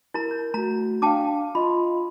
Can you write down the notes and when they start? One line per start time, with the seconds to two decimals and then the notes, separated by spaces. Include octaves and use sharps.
0.14 E4 A#4 A#5
0.31 G6
0.54 A3 F#4 A#5
1.02 D4 F5 G5 A5 D6
1.55 F4 D#5 B5 C6